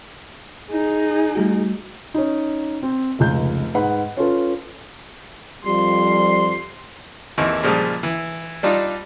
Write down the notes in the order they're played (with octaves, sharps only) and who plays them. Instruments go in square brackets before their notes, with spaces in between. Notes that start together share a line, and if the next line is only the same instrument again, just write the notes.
[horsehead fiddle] D#4 G#4
[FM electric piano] G3 A3 F#4
[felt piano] C#4 D#4
C4
F1 C#2 G6
G#2 B4 F#5 B5
C#4 F4 A4 B4
[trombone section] F2 F3 G3 [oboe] C6
[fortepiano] G#1 D#2 E3
A#2 C#3 F3 G3 G#3
E3
G3 D4 D#4 F4